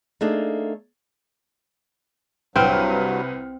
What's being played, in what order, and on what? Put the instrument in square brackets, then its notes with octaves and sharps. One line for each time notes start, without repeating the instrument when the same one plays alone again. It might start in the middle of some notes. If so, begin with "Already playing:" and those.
[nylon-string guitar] A3 A#3 D4 D#4 G#4 A4
[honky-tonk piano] C2 B4 F6 [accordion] G2 F#3 [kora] C4